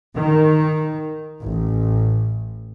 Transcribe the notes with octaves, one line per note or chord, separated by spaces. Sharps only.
D#3
A1